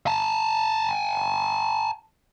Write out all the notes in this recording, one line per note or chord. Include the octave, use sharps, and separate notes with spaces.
G#5 A5